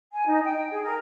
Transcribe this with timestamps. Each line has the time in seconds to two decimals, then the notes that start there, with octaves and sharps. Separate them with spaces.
0.13 G#5
0.26 D#4
0.45 G5
0.71 G#4
0.84 A#4